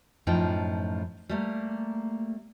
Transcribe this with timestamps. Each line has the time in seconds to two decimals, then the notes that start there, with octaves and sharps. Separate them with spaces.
0.27 F#2 A2 F3 D#4 G5
1.29 G3 A3 A#3